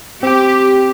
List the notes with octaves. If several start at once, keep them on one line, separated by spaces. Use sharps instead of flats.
C4 G4 G5